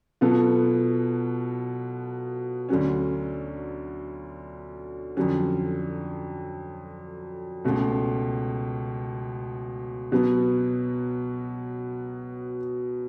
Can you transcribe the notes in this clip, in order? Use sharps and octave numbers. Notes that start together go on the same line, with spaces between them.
B2 F#3 B3 F4 A4
D2 D3 F#3 C#4
F2 D3 F#3 C#4
C#2 B2 A3
B2 F#3 B3